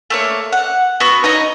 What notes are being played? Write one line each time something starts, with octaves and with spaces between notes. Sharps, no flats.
A3 A#3 C#5
F#5
B3 F#4 C#6 E6
D#4 C#5 D#5 A#5